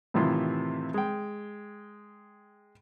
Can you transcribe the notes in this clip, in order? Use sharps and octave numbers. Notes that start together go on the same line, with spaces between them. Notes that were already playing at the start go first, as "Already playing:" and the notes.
A2 C3 D#3 E3 F4
G#3 G5